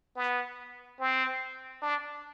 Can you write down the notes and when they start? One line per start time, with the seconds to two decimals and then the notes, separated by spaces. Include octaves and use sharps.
0.16 B3
0.99 C4
1.82 D4